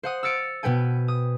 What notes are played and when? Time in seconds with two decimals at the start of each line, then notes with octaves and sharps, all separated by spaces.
0.03 C5 F#5 D#6
0.23 E6 F6 A6 C#7 D7
0.63 B2 B3 B4 G5 G#5
1.08 D#6